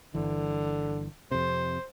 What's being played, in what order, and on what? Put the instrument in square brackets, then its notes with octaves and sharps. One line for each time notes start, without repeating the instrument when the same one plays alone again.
[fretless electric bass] G1 E3 [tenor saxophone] D3
[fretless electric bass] F2 C3 [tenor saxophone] C5